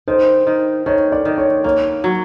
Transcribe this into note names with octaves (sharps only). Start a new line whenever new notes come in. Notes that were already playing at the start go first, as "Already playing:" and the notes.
D#3 C5
D#3
D#3 C#5
D5
D#3
C#5
A#3 C#5
F#3